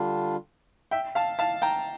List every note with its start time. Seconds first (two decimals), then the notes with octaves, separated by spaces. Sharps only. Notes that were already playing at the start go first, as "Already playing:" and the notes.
Already playing: D3 G3 D4 F4
0.91 E5 G5
1.15 F5 A5
1.39 F5 A5
1.62 G5 A#5